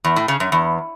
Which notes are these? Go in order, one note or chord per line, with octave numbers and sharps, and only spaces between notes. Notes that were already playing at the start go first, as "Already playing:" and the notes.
E2
A2
C#3
F#2
E2